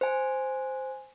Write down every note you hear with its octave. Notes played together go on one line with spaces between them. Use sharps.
C5 G#5